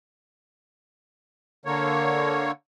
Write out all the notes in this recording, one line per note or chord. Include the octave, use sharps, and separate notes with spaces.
D3 A#3 C#5